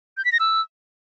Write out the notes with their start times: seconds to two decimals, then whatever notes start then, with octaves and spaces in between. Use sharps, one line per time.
0.17 G6
0.25 B6
0.32 A#6
0.40 E6